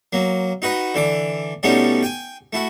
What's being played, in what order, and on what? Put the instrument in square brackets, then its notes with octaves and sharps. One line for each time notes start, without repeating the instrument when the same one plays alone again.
[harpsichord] F#3 A#3
D#4 F#4 B4 D#5
D3 E3 D6
B2 G3 A3 B3 C#4 D#4
G5 G#5
A3 E4 F#4